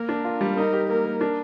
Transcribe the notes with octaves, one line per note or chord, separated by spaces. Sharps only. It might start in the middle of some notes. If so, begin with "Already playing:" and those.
Already playing: A#3 A#4
D4
F4
G3
D#4 A#4
G4
A#3 A#4
A#3
D4